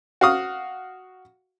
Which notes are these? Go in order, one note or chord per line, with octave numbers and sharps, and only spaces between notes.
F#4 F5 D#6